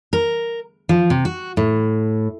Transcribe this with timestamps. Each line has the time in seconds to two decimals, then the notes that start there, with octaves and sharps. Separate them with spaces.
0.13 A#4
0.89 F3
1.10 C3
1.25 F#4
1.57 A2